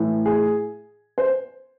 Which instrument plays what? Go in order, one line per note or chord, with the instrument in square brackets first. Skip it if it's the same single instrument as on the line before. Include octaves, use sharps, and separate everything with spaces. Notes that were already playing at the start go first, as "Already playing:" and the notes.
Already playing: [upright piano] A2 E3
G#4
C5